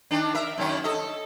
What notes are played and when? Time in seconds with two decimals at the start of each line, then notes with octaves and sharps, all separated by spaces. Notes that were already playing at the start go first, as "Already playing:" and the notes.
0.11 D#3 D4
0.34 A#4 E5
0.58 F#2 D#3 C#4
0.84 A4 D#5